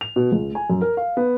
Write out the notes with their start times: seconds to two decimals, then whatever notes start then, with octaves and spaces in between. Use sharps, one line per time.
0.01 F7
0.16 B2
0.32 C#2
0.55 G#5
0.70 F#2
0.81 A#4
0.97 F5
1.17 B3